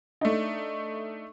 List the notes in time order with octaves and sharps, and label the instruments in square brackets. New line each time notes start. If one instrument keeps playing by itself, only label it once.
[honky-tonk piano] A3 D4 D#4